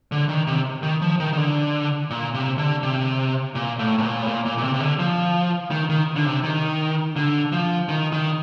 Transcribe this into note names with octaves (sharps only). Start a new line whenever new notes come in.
D3
D#3
C3
D#3
F3
D#3
D#3
D3
A#2
C3
D3
C3
A#2
A2
A2
A#2
A2
A#2
A#2
A#2
C3
C3
D3
F3
D#3
D#3
D3
C3
D#3
D3
F3
D#3
D#3